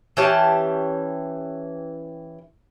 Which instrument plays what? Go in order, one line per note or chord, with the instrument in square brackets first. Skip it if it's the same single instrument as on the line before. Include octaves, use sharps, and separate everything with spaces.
[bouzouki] E3 C#4 G4 A5